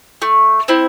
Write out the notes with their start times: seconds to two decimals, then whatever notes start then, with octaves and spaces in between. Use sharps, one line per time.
0.22 A3
0.68 C4 E4